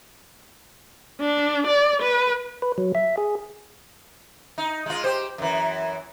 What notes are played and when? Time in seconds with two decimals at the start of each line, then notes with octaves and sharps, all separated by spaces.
1.20 D4
1.67 D5
2.02 B4
2.62 B4
2.78 F#3
2.95 E5
3.17 G#4
4.58 D#4
4.86 G#3 F4
5.04 G4 C5
5.38 F#2 E3